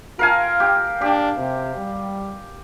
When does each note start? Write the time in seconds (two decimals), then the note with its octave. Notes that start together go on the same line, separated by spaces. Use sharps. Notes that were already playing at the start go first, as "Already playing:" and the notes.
0.19 F4 A#4 F5 G#5
0.60 G4
1.01 D4 G4
1.37 C3
1.76 G3